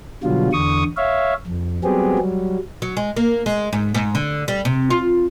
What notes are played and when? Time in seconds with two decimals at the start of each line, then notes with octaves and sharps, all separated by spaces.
0.24 B2 D3 F#3 G3 F4
0.53 E2 D3 C#6 D#6
0.97 C#5 E5 F5
1.47 F2
1.84 F#3 G3 B3 C4 G4 G#4
2.18 F#3 G3
2.82 F#3
2.97 G#3
3.17 A#3
3.46 G#3
3.73 G#2
3.94 G#2
4.15 D3
4.48 G3
4.65 C3
4.90 F4